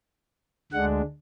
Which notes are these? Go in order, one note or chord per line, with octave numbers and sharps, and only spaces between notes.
D2 D3 G#3 D4 F#5